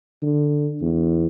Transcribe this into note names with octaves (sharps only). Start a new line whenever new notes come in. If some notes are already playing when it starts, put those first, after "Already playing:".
D3
E2